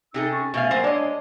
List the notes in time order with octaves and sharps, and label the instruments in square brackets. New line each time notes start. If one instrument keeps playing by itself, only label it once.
[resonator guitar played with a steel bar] C3 G#4 A4 [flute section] D#4 E6
[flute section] C#4 C#6
[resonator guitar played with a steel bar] B2 A3 F5 [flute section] G#5
[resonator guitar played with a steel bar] F#3 A#3 C5
[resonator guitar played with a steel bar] G#3 D#5 [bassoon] D4 [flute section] C#5